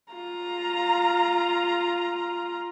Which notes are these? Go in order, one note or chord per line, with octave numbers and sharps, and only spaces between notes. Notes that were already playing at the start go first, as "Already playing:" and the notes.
F4 A#5